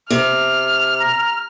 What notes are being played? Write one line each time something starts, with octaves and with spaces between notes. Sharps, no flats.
C3 F6
A#5